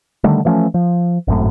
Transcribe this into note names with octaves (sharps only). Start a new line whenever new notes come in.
D3 D#3 G3 A3
E3 F3 A3 C#4
F3
G#1 F#2 A2